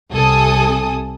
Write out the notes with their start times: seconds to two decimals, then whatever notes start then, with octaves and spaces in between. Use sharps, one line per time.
0.13 C2 C3 A4 G#5 D#6